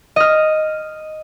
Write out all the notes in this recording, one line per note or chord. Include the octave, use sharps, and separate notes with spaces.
D#5 F6